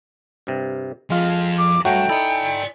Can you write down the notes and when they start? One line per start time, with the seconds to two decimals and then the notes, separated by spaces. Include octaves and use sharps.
0.47 G2 C3
1.10 F2 G#3 F4
1.58 D6
1.85 G2 F#3 A3 F#4 G5
2.09 D#4 E4 A4 D5 G#5